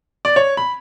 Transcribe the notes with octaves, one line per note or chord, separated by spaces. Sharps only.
D5
C#5
B5